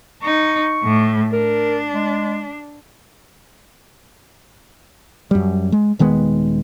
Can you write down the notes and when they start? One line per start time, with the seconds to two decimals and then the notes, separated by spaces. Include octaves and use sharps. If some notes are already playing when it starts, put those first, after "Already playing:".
0.23 D#4 C#6
0.84 A2
1.32 D4 A#4
1.92 G#3
5.31 F#2 G3
5.72 G#3
5.99 D#1 D#3 G#3 B3